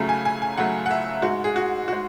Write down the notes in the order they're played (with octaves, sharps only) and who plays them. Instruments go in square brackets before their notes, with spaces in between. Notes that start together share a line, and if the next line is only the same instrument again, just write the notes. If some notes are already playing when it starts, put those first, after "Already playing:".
Already playing: [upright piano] C#2 C#3 F#3 A3
G#5
G#5
G#5
C#2 C#3 F#3 A3 F#5
F#5
E5
G#2 G#3 F#4
G#4
F#4
F#4
G#3